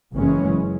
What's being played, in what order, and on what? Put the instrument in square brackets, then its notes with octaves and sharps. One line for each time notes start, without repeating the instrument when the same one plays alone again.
[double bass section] F#1 F#2 E3 G#3 C#4